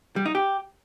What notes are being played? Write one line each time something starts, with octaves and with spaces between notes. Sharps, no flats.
G3
D#4
G4